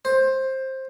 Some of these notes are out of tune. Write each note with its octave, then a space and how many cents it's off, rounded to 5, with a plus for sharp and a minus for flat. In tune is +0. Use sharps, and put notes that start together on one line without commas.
C5 +15